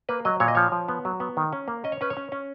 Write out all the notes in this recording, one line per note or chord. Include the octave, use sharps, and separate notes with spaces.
A#3 B4
F#3 D#5
A#2 C#5
D#5
F3 C#5
F3
B3
F#3
B3
D#3
C#4
A#3
C#4 D#5
C#5
C#4 B4
C#5
C#4
C#4